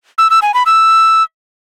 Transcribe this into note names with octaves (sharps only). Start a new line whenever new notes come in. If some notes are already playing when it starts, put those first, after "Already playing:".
E6
E6
G#5
B5
E6